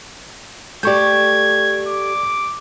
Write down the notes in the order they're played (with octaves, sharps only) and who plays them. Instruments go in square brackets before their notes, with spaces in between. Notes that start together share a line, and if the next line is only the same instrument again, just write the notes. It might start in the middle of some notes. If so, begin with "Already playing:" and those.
[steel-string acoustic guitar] A3 G4 [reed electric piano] D5 C#6 G6 [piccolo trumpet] G#6
[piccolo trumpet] D6